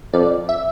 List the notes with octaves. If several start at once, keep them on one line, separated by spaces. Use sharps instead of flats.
F2 D5
E5